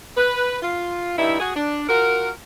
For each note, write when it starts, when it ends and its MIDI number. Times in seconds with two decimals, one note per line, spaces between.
0.17 0.57 71
0.62 1.15 65
1.17 1.37 43
1.17 1.37 63
1.17 1.37 64
1.40 1.54 66
1.40 1.54 68
1.55 1.87 62
1.89 2.30 65
1.89 2.30 66
1.89 2.30 70